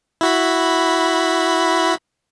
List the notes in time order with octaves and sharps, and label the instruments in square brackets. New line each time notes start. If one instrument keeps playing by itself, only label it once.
[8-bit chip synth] E4 F#4 B5